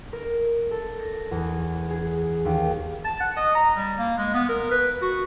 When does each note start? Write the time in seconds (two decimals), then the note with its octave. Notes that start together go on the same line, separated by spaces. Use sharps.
0.13 A#4
0.71 A4
1.00 A#6
1.31 E2
1.91 G#4
2.45 D#2
3.04 A5
3.20 F#5
3.36 D#5
3.55 A#5
3.76 G3
3.98 A#3
4.18 G#3
4.34 B3
4.49 A#4
4.71 B4
5.02 F#4